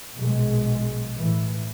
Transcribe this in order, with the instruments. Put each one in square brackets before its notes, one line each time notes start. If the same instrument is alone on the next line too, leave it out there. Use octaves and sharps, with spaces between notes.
[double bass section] A#1 B2 G#3
A2 E3